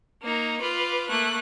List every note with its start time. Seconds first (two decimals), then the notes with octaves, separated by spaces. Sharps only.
0.22 A#3 D#4 A#5
0.60 F4 B4 D6
1.08 A3 A#3 F#6